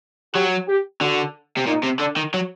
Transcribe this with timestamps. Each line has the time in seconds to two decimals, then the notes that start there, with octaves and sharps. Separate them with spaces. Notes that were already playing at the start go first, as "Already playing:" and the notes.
0.34 F#3 G4
0.68 G4
1.01 D3 F#4
1.57 C3
1.67 A#2 D#4
1.84 C3
2.00 D3 D4
2.16 D#3
2.34 F#3